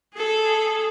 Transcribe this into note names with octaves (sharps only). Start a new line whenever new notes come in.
G#4 A4